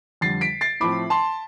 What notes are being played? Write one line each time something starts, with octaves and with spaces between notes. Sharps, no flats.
F2 D3 G3 A6 C7
B6 D7
A6 C7
A2 F3 A3 C4 B5 D6
A5 C6